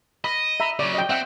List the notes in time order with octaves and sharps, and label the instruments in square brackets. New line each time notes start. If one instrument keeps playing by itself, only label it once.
[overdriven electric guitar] D#5 [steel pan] B5
[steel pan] E5 A#5 B5
[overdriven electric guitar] C#3 F#3 [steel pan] D5
[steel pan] D#5 G5
[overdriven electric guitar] C4 [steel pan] E5 F#5 G5